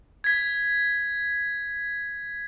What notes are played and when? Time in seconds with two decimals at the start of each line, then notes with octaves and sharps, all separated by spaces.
0.24 G#6 B6